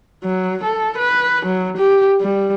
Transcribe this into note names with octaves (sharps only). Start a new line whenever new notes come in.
F#3
A4
B4
F#3
G4
G3